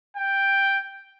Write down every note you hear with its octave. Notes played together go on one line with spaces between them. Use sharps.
G5